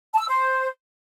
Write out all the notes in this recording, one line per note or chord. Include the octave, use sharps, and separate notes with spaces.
A5
E6
C5